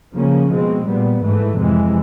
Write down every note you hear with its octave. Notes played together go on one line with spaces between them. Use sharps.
C#3 F3 A#3 C#4
B2 G#3 C4
A#2 G3 B3
G#2 E3 A3
F2 C3 E3 G#3